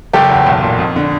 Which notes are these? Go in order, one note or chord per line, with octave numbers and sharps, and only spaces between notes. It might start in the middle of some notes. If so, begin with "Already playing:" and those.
F#1 G4 A4
E2
B1
A#2
F2
D3